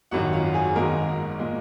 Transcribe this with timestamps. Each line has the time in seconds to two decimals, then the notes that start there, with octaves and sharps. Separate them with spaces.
0.11 G#1 F#2 D#3 F#4 F#5
0.33 F4 F5
0.54 G#4 G#5
0.76 G#1 G#2 D#3 G#3 A#4 A#5
1.40 A#2 G#3